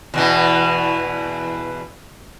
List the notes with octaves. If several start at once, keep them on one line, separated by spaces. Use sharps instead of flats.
E2 B2 E3